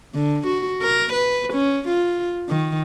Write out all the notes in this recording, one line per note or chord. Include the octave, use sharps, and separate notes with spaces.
D3
F#4
A#4
B4
C#4
F4
D#3